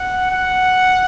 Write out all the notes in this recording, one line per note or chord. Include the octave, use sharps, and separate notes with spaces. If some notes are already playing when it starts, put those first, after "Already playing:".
Already playing: F#5
F#5